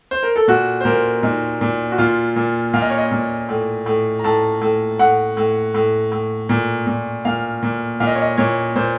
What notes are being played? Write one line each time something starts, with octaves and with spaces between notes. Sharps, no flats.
C5
A#4
A4
A#2 F#4
C5
A#2 A#4
A#2 D#4
A#2
F#4
A#2 F4
A#2
A#2 F5
D#5
C#5
D#5
A#2
A2
A2
A#5
A2 A5
A2
A2 F#5
A2
A2
A2
A#2
A#2
A#2 F5
A#2
A#2 F5
D#5
C#5
D#5
A#2 C#5
A#2 C5